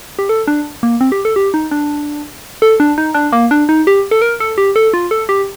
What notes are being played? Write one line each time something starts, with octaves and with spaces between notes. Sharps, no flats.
G4
A4
D4
A#3
C4
G4
A4
G4
D#4
D4
A4
D4
D#4
D4
A#3
D4
D#4
G4
A4
A#4
A4
G4
A4
F4
A4
G4